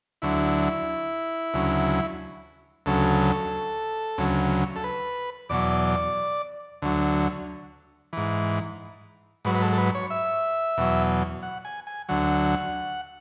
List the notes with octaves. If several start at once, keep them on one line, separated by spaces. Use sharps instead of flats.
D2 D3 F#3 E4
D2 C#3 F#3
D2 C#3 F#3 A4
D2 C#3 F#3
A4
B4
E2 B2 F#3 D5
D2 D3 F#3
G#2 E3
G#2 F#3 B4
B4
A4
A4
B4
C#5
E5
E2 B2 F#3
F#5
G#5
G#5
D2 D3 F#3 F#5